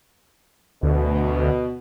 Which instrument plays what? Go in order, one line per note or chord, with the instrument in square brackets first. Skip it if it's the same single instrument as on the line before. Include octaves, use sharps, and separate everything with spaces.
[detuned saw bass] D2 [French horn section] B2